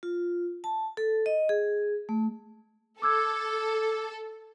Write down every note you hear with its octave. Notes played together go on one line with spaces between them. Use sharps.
F4
A5
A4
D#5
G#4
A3
A4 D6 E6 G#6